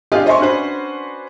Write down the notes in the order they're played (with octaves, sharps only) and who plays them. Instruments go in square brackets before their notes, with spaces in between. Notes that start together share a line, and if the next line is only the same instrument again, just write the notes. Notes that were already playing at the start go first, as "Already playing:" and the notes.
[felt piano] D4 F4 G4 G#4 D#5 F5
C5 D#5 E5 G#5 C6 C#6
C#4 D4 F#4 B4 C5